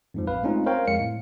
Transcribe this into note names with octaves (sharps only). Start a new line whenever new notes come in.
F2 G#2 F3
A#1 B4 F5
G#3 A3 C4 C#4 D#4 F4
A#4 C5 C#5 F5 G5 A#5
F2 G#3 F5 C#7
A2